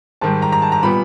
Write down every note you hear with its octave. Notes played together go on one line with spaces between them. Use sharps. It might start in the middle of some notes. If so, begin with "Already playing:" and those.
G#2 D#3 G3 A5
A#5
A#5
A5
A#5
A#2 G3 B3 B5